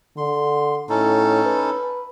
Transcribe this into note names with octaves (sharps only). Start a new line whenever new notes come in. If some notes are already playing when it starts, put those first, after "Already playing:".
D3 C6
A2 C#4 D#4 A4
B4